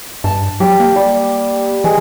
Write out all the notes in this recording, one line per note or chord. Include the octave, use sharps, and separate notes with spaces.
G2 A5
F#3 G4
A#3
G3
E3 G#3